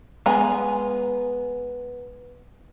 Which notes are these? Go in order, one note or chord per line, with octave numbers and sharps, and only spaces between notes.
G#3 B3 G#5 A#5